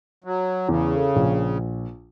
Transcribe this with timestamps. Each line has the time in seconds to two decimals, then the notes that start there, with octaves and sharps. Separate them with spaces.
0.24 F#3
0.69 E2 C#3
0.96 A4
1.16 A#1